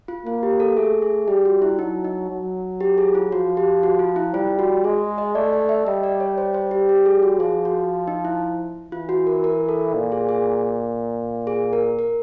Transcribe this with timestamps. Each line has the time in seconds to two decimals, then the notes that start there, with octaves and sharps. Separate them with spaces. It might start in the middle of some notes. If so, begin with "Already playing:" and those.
0.08 F4
0.26 A#3 F4
0.43 G4
0.60 A4
0.77 A3 G#4
1.02 G#4
1.28 G3 G4
1.45 F#4
1.62 E4
1.79 F#3 D#4
2.04 D#4
2.30 F#3
2.81 G4
2.98 G#4
3.15 F4
3.32 F3 F#4
3.57 G4
3.83 F#4
3.99 F4
4.16 E4
4.34 G3 F4
4.59 F#4
4.84 G#3 G#4
5.18 D#5
5.35 A3 D5
5.53 D5
5.69 E5
5.86 G3 D#5
6.03 D5
6.20 C#5
6.38 C5
6.54 C5
6.71 G4
6.89 G4
7.06 G#4
7.23 F#4
7.39 F3 G#4
7.65 F#4
8.08 D#4
8.25 E4
8.92 E3 F4
9.09 F#4
9.27 A#4
9.44 A#4
9.69 A4
9.95 A#2
10.12 G#4
10.29 G#4
11.47 G#4
11.73 A#4
11.99 A#4